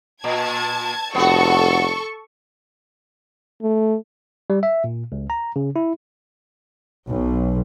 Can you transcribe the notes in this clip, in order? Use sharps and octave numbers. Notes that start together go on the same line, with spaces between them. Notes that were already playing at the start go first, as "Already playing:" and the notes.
A#2 A5 G#6
F1 B3 F#4 A4 C#6
A3
G3
E5
A#2
C#2
A#5
C#3
E4
B1